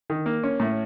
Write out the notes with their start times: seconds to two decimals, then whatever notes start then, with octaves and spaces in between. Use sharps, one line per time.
0.10 D#3
0.26 A#3
0.43 C#4
0.60 A2